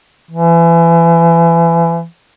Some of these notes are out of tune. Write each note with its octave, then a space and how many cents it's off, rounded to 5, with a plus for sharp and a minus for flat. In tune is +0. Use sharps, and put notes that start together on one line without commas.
E3 +30